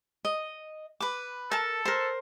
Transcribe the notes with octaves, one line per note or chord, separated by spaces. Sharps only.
D#5
B4 D6
A4 A#4 A5
A#4 C5